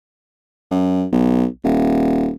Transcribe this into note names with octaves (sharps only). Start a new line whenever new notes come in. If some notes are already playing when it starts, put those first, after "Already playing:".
F#2
B1
D#1